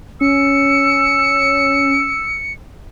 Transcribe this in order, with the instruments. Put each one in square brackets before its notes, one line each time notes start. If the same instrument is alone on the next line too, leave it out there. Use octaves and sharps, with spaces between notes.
[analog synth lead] C#4 [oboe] E6 [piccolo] C#7